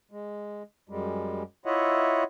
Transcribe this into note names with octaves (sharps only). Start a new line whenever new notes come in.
G#3
F#2 G3 G#3
E4 F4 C#5 D#5 E5 F#5